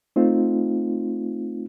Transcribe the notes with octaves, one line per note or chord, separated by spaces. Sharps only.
A3 C4 D#4 F4